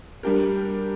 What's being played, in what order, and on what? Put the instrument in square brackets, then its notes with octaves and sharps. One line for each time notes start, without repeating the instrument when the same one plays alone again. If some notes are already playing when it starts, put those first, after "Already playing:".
[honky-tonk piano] G3 D4 G4 A#4